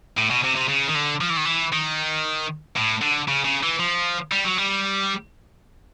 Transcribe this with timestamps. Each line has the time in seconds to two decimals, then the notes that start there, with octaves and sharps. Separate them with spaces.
0.17 A2
0.30 B2
0.44 C3
0.56 C3
0.69 C#3
0.88 D#3
0.95 D3
1.21 F3
1.30 E3
1.37 D#3
1.45 E3
1.73 D#3
2.77 A2
3.02 D3
3.28 C#3
3.45 C#3
3.63 E3
3.80 F3
4.32 G3
4.45 F#3
4.58 G3